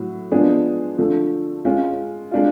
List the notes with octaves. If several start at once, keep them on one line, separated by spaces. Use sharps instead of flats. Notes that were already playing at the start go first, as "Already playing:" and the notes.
Already playing: A2 F#3 F#4
F3 G#3 B3 D4 G#4
D3 F3 A3
G#3 C#4 F4
G#3 D4 F4